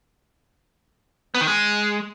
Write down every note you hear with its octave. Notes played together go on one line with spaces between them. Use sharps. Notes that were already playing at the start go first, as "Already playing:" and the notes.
B3
D#3
G#3